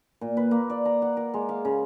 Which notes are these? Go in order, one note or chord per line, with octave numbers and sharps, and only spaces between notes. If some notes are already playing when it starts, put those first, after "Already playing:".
A#2
B4
A#3
D5
A#5
F#5
A#4
G#3
F5
C#3